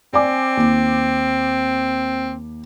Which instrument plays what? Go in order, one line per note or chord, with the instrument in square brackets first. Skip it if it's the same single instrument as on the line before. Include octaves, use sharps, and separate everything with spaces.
[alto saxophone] C4 [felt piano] D5 G#5 D6
[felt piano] D#2